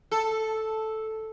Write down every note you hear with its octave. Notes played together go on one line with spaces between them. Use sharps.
A4